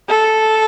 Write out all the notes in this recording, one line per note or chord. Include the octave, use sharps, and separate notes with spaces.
A4